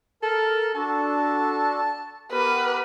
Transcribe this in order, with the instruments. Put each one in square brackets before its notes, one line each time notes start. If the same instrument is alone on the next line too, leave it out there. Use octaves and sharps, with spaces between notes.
[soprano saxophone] A4 [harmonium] A#4 A5
[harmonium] D4 F#4 A4 [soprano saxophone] A5
[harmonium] B3 G4 A#4 [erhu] B4